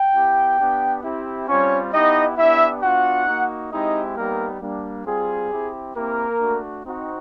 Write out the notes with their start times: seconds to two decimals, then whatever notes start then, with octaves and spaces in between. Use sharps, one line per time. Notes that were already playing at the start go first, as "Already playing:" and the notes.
Already playing: G5
0.14 B3 E4 G4
0.59 B3 D4 G4
1.03 C4 E4 G4
1.48 G3 C4 C#4 F4 C#5
1.93 B3 D#4 E4 G4 D#5
2.37 B3 D4 E4 G4 E5
2.82 B3 D4 F4 F#4 F#5
3.27 A#3 D#4 F#4
3.71 G#3 C4 D#4 E4 G4 D#5
4.16 G3 A#3 B3 D#4 G4 A#4
4.61 G3 A#3 D4
5.06 G3 C4 F4 G#4
5.50 C4 E4 G4
5.95 A#3 C4 E4 G4 A#4
6.39 A3 D4 F#4
6.85 C4 D#4 F#4